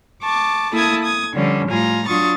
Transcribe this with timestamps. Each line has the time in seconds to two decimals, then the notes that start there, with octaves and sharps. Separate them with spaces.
0.22 A5 C#6 D6
0.72 A#3 E4 A4 A5 D#6 G#6
1.03 D#6 G#6
1.34 D3 F3 G3 C#4 D4
1.68 A2 G3 F4 G#5 A#5
2.07 F#3 D4 F4 C#6 D#6 A6